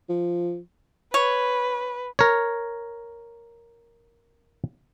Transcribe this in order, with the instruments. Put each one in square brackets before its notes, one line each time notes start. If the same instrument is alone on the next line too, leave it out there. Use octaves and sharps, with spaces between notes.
[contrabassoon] F3
[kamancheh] B4 [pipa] C#5
[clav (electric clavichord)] A#4 C#5